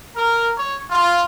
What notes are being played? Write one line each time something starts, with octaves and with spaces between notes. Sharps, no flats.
A#4
C#5
F4